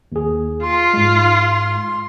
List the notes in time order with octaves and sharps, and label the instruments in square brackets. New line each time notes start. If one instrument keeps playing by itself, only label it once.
[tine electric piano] D#2 G#4
[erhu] F4 [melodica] C6
[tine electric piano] G#2 G#3